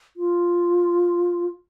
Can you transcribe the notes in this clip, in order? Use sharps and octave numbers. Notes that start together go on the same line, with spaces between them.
F4